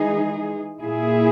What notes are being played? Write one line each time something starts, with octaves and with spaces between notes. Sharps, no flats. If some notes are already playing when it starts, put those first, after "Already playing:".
Already playing: E3 G#3 D#4 G#4
A#2 A#3 E4 G#4